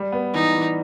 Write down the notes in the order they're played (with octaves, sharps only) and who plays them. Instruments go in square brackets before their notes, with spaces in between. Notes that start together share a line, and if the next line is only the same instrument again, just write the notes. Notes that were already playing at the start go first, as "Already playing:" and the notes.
Already playing: [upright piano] G3
B3
[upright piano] E3 [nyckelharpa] D#4
[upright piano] E3